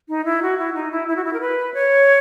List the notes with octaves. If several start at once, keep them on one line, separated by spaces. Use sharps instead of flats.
D#4
E4
F#4
E4
D#4
E4
E4
F#4
E4
A#4
B4
C#5